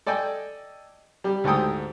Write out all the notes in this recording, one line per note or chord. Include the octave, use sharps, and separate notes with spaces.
A4 D5 D#5 G5 G#5
G3 G4
D2 G#2 G4 A4 G5 D#6